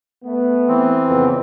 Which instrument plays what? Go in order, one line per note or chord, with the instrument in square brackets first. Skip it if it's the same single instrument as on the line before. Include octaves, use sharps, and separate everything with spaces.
[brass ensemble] A3 B3
[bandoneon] E3 C4
[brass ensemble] F2 C#3 B3